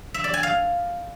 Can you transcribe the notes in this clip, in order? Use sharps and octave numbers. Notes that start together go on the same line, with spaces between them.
E5
D5
G#5
F5